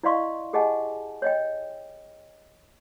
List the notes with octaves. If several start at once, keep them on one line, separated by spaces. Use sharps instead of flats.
E4 D5 D#5 F5 C6 C#6
G4 G#4 D#5 F#5 G#5 A5
C#5 D#5 G5